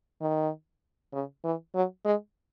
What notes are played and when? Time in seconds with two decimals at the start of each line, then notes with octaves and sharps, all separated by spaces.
0.21 D#3
1.13 C#3
1.44 E3
1.75 F#3
2.05 G#3